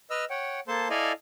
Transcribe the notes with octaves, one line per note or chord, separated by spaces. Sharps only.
B4 D#5 E6 F6
C#5 F#5 G5
A#3 A4 C5 A5 C6
E4 A4 D5 D#5 F5 G#5